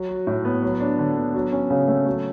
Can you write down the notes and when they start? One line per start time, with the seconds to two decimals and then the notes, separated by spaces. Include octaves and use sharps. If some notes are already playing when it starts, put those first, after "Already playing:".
Already playing: F#3
0.09 F#4
0.27 A2
0.45 B3
0.63 F#3
0.80 D4
0.99 D3
1.16 B3
1.34 F#3
1.52 C#4
1.70 C#3
1.88 A3
2.06 F#3